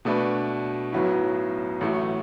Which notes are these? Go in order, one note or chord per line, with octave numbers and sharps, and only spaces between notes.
B2 A3 D4 B4
B1 A2 F#3 B3 E4
A1 A2 A3 F#4